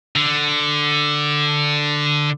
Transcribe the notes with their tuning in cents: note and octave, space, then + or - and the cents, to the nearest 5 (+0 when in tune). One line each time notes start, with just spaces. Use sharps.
D3 +5